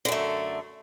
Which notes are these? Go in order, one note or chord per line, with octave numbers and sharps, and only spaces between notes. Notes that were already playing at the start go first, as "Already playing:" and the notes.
F#2 D3 A3